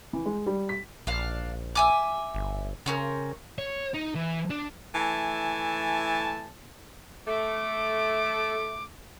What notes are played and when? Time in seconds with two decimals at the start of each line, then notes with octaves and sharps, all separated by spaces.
0.13 E3
0.26 G#3
0.46 G3
0.69 B6
1.07 A#1 D4 F5
1.75 E5 G#5 D6
2.35 G1
2.86 C#3 C4 C#4 A#4
3.58 C#5
3.94 D#4
4.15 E3
4.50 D4
4.95 E3 A3 G#5 A5
7.26 A3 D6